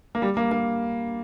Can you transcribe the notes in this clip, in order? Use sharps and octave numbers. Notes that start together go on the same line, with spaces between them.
A#3
G3
A#3
A#3